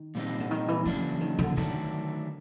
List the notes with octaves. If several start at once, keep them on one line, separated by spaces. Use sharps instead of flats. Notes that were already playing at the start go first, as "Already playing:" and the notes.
Already playing: D#3
A#2 G3 C4 D#4
D3
D#3
E3
C#3 E3 F#3 A#3 D4
D#3
D3
D3 D#3 F#3 A3 D4